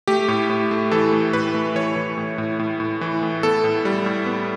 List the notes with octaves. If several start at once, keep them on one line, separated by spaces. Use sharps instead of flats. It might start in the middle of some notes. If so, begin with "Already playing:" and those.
A3 G4
A2
A2
A3
E3 A4
A2
A2 B4
A3
E3 C#5
E3
A2
A2
A2
A2
E3
A2
B3 A4
A2
G3
A2
B3